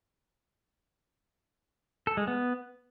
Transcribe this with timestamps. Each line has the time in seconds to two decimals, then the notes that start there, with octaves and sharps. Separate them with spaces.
2.07 A4
2.17 G#3
2.27 B3